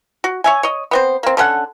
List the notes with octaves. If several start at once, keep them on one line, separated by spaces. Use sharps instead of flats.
F#4
C#5 E5 G#5
C#5 D#5
B3 C4 C5
A#3 C4
D3 C#4 A4 F#5